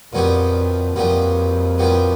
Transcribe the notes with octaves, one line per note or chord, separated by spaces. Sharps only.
F2 A#2 F#3 B3 D4 G4
F2 A#2 F#3 B3 D4 G4
A#2 F#3 B3 D4 G4